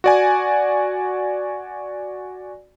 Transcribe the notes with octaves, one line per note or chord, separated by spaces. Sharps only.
F#4 D5 G#5